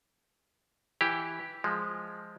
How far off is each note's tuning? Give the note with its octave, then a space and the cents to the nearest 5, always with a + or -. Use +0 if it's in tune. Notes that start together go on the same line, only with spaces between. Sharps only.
E3 +0 E4 +0 G4 +0
F3 +0 G#3 +0